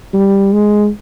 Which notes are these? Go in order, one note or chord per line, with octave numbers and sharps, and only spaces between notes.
G3
G#3